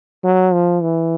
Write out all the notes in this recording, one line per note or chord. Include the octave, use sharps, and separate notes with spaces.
F#3
F3
E3